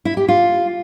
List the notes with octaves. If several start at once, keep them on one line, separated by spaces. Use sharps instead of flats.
E4
G4
F4